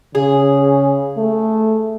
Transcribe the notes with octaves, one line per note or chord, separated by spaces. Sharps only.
C#3 G#4
A3